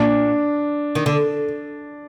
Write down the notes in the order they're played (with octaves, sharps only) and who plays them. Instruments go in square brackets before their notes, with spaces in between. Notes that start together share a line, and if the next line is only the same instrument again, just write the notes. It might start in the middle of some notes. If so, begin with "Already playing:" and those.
Already playing: [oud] A#2 [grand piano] D4
[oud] D#3
D3